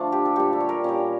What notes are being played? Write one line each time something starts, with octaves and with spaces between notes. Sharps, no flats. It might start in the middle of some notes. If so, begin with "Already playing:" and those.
Already playing: D3 F3 A3 D4 F4
G4
A4
A#2 G3 G4
A4
C#5
A#4
A#2 G3 C#4